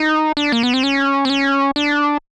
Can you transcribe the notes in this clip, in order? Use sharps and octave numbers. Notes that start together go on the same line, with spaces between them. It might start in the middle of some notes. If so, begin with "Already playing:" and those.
Already playing: D#4
D4
A#3
B3
C4
C#4
C4
C#4
D4